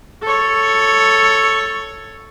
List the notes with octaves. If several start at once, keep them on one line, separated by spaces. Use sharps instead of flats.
A4 C#5